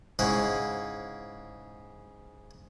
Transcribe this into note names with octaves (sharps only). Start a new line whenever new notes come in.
G#2 C#3 E4 C5 F#5